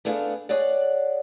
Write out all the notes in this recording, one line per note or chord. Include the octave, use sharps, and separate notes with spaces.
A3 B3 D4 G#4 F5
G#4 C#5 D5 F#5